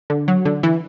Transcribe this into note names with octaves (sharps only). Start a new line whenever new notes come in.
D3
F#3
D3
E3